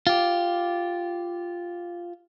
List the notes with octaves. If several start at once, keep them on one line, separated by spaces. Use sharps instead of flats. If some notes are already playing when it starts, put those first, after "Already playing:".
F4 G4